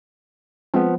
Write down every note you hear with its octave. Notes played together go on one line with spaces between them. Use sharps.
F3 G#3 B3 C4